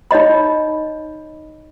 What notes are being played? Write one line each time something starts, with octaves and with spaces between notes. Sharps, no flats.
D#4 C#5 D#5 B5